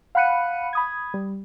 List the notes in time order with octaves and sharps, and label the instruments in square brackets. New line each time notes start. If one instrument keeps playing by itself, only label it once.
[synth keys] F5 F#5 B5 F#6 C#7 D#7
B5 D#6 G#6
G3